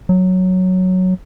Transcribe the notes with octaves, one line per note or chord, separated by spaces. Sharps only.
F#3